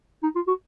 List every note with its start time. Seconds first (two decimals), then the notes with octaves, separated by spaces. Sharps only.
0.23 D#4
0.35 F4
0.47 F#4